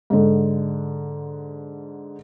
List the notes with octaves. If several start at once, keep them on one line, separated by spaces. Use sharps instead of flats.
G#2 D3